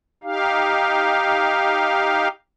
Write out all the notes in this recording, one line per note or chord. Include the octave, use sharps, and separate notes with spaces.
D#4 G4 F5